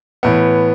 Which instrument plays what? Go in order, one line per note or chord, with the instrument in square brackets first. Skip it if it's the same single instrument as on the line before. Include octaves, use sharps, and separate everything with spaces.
[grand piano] A2 E3 B3